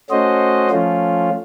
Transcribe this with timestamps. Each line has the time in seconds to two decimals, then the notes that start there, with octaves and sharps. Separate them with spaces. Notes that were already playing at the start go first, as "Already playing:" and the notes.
0.10 A3 C#4 F#4 C5 D#5
0.70 F3 A3 C#4 F4